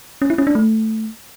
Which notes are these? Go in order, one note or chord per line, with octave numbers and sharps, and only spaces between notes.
C#4
E4
C#4
D4
A3